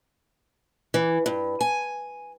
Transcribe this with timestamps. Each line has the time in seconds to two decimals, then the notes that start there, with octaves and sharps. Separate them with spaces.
0.94 E3
1.26 G2
1.61 G#5